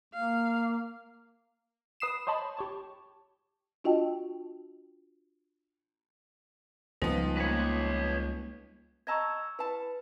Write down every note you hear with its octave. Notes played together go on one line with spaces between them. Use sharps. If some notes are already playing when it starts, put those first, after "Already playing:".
A#3 F5
B4 D#6 C7 E7
C5 C#5 D#5 A5 B5
G4 C#5 A5
D4 F4 F#4 D#5 G5 A5
C#2 F3 G3 G#3 B3 D#4
G3 A#3 B4 C#5
D#5 A5 A#5 C#6 E6 G#6
E4 B4 A5